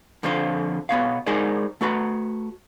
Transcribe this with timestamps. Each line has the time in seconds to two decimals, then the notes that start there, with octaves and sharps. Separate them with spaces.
0.23 F2 D3 F3 F4 C5
0.89 B2 B3 C#5 F5
1.26 G#3 D#4 G#4 A#4 C5 D5
1.81 A3 F#4 B4 A#5